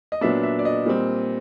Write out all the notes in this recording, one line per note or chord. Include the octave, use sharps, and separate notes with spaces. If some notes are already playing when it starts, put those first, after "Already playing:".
D#5
A#2 F#3 B3 D4 E5
E5
D5
D#5
A#2 G3 C4